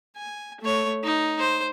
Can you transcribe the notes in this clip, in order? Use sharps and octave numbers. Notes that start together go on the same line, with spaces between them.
G#5
A3 C#5
D#4
C5